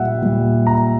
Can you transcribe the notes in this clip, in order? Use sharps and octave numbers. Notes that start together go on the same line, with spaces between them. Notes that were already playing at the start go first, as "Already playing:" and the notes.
Already playing: A#2 G3 E5 F#5
A#2 G3
A#5